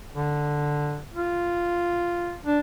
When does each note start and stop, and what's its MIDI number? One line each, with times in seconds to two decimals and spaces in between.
0.13 0.99 50
1.14 2.36 65
2.46 2.59 62